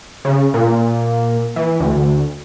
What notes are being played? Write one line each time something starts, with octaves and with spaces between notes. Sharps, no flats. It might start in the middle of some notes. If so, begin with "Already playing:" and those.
C#3
A#2
E3
D2